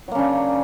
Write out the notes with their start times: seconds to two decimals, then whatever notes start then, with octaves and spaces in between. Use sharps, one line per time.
0.08 F#3
0.11 A#3
0.15 C#3
0.19 D4